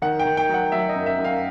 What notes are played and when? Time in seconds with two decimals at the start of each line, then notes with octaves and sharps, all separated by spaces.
0.02 D#3 F#5
0.20 G5
0.25 D#3
0.37 G5
0.49 F#3 F#5
0.72 F#3 E5
0.89 D#5
0.95 F#2
1.06 E5
1.18 F#2
1.24 F5